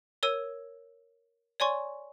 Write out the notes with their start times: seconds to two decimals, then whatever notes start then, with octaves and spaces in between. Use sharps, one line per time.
0.23 A#4 C#5 E6 G#6 D#7
1.60 C#5 D5 G#5 C6 C#6